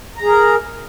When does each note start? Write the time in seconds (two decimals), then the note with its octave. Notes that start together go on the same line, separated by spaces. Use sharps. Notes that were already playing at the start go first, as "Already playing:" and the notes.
0.18 A#5
0.22 G#4
0.27 A#4